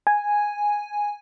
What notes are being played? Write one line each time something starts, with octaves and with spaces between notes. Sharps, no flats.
G#5